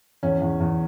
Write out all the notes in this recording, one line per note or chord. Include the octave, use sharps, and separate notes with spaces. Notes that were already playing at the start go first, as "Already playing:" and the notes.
E2 C#4
E2
E2